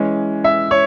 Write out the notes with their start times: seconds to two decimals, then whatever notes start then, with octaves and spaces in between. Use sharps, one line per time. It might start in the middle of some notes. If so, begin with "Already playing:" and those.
Already playing: E3 G#3 C#4
0.44 E5
0.71 C#5